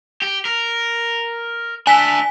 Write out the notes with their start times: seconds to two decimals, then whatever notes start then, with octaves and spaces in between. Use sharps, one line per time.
0.22 G4
0.45 A#4
1.87 D4 E5 G#5 B6